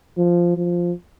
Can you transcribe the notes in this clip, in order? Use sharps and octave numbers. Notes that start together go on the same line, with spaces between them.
F3
F3